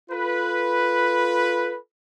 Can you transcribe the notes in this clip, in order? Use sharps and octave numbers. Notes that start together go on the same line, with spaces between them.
F4 A4 B4